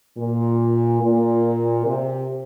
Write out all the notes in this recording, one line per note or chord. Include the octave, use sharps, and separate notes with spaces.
A#2
A#2
C3